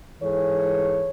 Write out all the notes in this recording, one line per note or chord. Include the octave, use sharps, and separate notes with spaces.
G#2 E3 G#4 A4 C#5